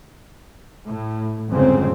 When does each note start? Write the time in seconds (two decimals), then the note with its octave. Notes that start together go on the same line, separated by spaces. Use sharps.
0.89 A2
1.49 G1 F2 G#2 C#3 C4